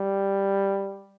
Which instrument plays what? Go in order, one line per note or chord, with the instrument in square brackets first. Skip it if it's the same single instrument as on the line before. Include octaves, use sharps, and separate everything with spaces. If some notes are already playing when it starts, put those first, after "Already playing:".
Already playing: [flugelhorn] G3